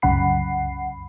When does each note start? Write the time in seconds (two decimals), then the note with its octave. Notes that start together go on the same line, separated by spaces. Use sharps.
0.02 C2 F#2 C#3 F#5 B5 C7